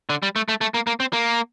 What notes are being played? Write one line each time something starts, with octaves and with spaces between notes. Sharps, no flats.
D3
G3
A3
A3
A3
A#3
A#3
C4
A#3